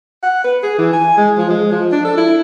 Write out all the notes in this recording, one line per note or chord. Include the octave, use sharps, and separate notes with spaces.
F#5
B4
G#4
E3
G#5
G#3
F3
G#3
F3
D4
A4
E4